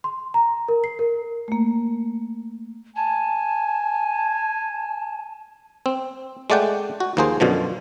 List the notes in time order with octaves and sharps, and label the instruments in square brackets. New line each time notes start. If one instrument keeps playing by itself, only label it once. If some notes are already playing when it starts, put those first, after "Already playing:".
[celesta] C6
A#5
A#4
C7
A#4
[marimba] A3 A#3
[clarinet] G#5 [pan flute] A5
[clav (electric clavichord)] C4
G#3 A3 D5 F#5 G5
F#4
D#2 F3 A#3 G#4 C5
F#2 B2 D3 F3